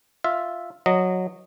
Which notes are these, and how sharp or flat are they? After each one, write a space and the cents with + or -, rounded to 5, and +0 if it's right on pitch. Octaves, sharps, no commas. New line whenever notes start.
F4 +0 E5 +0
F#3 -10 D#5 -10